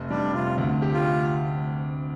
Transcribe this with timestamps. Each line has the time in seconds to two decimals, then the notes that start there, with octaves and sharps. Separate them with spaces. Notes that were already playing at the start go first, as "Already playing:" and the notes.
Already playing: F1
0.10 G3 D4
0.34 C3 F4
0.58 D2
0.82 G4
0.93 F4